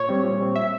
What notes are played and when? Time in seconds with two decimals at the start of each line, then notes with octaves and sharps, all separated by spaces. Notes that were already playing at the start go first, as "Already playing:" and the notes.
Already playing: A#2 C#5
0.09 G3 C4
0.24 A#2
0.40 G3 C4
0.56 E5